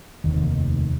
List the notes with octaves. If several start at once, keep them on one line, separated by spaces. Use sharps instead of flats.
F1 D#2 D#3